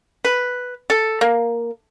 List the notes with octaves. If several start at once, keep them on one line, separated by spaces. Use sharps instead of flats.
B4
A4
A#3